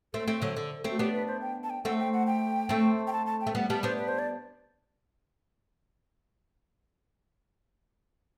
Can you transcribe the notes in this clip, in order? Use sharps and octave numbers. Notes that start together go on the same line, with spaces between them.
A3 C4 A4
A3 C4
D3 F#3 A4
D3
A3 C4
F#4
B3 D4 G4
B4
C5
G5
A5
G5
A3 C4 F#5
G5
F#5
G5
A3 C4
G5
A5
A5
G5
A3
G3 B3 F#5
G3 B3 A5
B3 D4 C5
B4
C5
D5